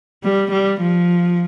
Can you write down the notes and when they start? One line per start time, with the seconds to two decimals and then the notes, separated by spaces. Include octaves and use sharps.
0.24 G3
0.52 G3
0.81 F3